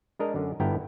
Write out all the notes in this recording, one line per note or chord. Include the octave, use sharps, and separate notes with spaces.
G#3 D4 A#4 D#5
F#2 D3 C#4
G1 G2 B3 E4 G5 A#5